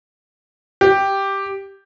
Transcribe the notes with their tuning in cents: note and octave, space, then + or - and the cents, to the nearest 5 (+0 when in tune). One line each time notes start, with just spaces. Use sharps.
G4 +0